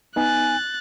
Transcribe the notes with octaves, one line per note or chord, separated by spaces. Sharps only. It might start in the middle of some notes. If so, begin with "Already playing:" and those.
B3 D#4 G#5 F#6 A6